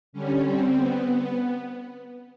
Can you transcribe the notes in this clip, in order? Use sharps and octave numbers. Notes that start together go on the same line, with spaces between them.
D3 G3 C#4
C4
B3
B3